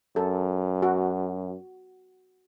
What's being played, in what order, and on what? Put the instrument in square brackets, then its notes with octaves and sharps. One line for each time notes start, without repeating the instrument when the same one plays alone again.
[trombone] F#2 [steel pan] A4
[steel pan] F#4